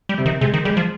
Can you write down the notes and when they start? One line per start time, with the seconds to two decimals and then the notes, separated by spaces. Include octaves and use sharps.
0.09 G3
0.18 C3
0.26 D#3
0.41 C3 G#3
0.54 D#3
0.65 G3 G#3
0.77 F3